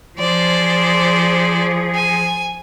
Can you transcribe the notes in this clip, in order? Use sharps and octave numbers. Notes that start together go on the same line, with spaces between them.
F3 G#4 C5 D5
G#5